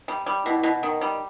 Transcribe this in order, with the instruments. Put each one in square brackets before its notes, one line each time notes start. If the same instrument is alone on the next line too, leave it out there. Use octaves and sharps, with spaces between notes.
[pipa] G3
G3
[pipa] B2 [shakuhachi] E4
[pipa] B2
D#3
G3